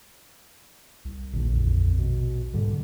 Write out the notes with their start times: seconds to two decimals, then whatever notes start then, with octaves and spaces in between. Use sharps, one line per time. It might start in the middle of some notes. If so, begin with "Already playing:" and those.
1.05 C2
1.33 A#1 D#2 D3
1.52 F2
1.99 B2
2.54 C2 G#2 D3 G3